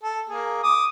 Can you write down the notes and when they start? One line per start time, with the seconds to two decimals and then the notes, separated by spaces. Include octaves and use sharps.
0.03 A4
0.29 A#3 G#4
0.63 D6 D#6